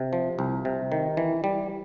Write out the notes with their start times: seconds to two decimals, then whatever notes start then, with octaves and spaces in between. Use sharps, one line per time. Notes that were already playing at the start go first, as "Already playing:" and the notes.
Already playing: C3
0.13 F3
0.39 C2
0.65 C3
0.92 D#3
1.17 E3
1.44 G3